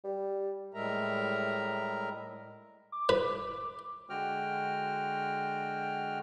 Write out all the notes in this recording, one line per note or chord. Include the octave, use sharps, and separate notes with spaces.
G3
A2 G3 G#3 A#4 E5 A#5
D6
B4
D3 G#3 F#4 G5 F6